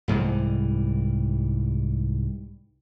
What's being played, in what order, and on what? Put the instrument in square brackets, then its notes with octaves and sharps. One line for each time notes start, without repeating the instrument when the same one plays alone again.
[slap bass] C2 G#2 E3 G3